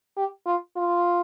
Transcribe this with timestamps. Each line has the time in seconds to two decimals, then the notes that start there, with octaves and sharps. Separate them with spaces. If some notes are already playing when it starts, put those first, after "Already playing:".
0.17 G4
0.46 F4
0.76 F4